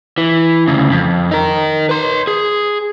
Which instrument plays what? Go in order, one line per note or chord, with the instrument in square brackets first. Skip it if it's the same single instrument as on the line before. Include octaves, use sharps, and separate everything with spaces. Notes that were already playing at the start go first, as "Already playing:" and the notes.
[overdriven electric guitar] E3
D2 C#3
F2
D#4 A#4
B4 C6
G#4